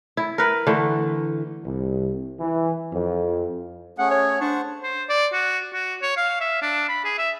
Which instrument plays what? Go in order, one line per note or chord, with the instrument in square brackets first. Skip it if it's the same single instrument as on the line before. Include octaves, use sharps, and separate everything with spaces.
[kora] E4
A#4 B4
D3 E3 A3
[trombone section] C2
E3
F2
[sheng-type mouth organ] A3 C#4 G#4 [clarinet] F#5
[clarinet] C#5
[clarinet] D4 [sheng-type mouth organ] C5 F#5 C#6
[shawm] C5
D5
F#4
F#4
C#5
F5
E5
D4
B5
G#4
E5